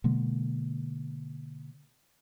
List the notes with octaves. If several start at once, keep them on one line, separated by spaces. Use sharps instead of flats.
B2 D3 G#3 A#3